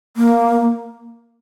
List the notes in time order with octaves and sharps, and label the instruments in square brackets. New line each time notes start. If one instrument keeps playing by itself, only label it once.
[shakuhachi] A#3